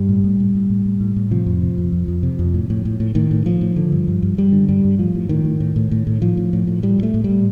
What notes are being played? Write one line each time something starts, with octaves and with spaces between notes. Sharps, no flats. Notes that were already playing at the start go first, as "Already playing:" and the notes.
Already playing: G2 G3
A2
A2
A2
A2
A2
A2
A2
A2
C3 F3
F2
C3
F2
F2
F2
C3
F2
A2
A2
A2
A2
A2 D#3
A2
A2 F3
A2
D3
G2
G2
G2
G2 G3
D3
G2 G3
G2
A2 F3
A2
A2 D#3
A2
A2
A2
A2
A2
A2 F3
A2
A2
A2
A2 G3
A2 A3
A2
A2 G3